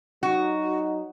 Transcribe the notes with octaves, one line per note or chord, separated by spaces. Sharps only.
F#3 D#4 F#4